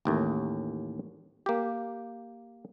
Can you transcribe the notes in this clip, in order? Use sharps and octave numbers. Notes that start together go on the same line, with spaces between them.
A1 D#2 A2
A#3 G4